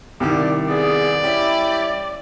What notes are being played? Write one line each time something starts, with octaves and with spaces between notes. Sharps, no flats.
C2 D#3 G3 D5
B3 G#4 D5
G3 C#4 E4